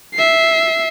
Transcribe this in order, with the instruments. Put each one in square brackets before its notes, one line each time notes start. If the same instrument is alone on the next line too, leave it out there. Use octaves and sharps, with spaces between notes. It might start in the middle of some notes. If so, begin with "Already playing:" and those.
[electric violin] E5 C7